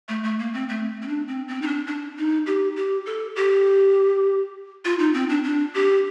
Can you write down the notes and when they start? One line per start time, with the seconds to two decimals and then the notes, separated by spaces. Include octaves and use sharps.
0.09 A3
0.24 A3
0.39 A#3
0.54 C4
0.69 A3
1.02 C4
1.08 D4
1.28 C4
1.48 C4
1.62 D#4
1.67 D4
1.87 D4
2.17 D#4
2.46 G4
2.76 G4
3.06 A4
3.36 G4
4.85 F4
4.99 D#4
5.14 C4
5.29 D4
5.44 D4
5.74 G4